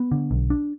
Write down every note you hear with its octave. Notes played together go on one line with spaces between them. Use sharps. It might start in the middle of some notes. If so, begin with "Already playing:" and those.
Already playing: B3
D3
B1
D4